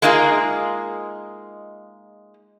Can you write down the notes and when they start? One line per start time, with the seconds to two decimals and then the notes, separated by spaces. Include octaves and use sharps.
0.02 G#3 A#3 D#4 F4 G#4